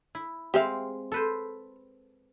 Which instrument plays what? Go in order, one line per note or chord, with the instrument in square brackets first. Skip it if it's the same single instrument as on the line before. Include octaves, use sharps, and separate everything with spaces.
[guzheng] E4
[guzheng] G#3 C4 F5 [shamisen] G4 E5
[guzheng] A4 B4 C5